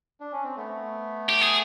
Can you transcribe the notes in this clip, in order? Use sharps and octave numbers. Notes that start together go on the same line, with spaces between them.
D4
C#4
C4
A3 B3
G4
G#4